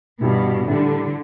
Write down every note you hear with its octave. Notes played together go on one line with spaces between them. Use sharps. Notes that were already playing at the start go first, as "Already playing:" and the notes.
G2 B2 E3 G3 E4
A2 D3 E3 G3 D4